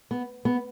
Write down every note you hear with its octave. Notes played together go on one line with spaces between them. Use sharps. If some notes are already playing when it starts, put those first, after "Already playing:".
B3
B3